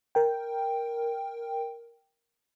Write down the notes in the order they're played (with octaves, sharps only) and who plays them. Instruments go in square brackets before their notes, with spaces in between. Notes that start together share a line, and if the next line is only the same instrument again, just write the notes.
[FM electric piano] A#4 G5